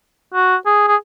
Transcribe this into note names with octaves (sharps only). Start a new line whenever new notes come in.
F#4
G#4
G#4